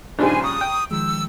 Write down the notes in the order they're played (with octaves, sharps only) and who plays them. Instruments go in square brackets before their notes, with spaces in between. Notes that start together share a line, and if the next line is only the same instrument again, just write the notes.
[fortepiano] A#1 G2 C#3 [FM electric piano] D4 D#4 [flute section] C5 G#5
[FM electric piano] A#5 C#6 [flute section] D#6
[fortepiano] G5
[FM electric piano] D#3 F3 G#3 [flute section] E6